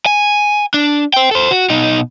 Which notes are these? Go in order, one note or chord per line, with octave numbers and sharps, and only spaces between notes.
G#5
D4
C5 G5
A4 C5
F#4
B2 D#4